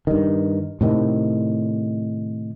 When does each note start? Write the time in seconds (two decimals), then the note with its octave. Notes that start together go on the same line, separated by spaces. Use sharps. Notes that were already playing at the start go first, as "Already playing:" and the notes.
0.07 G2 D#3
0.81 A2 C3 D#3